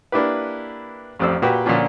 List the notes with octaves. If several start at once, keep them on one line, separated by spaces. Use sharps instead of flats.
A#3 D4 E4 G4 B4
A1 F2 C5 D5 E6
A#2 F#4 G4 B4 G5
A#2 D3 F3 C#4 D4 F4